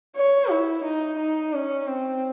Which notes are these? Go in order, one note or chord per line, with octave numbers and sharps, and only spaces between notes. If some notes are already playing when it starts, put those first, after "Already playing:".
C#5
E4
D#4
D#4
C#4
C4